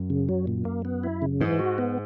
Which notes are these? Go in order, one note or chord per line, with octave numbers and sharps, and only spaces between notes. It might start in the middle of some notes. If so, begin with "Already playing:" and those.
Already playing: F#2
C#3
F#3
A#2
A#3
B3
E4
C#3
G#2 E3
F#4
B3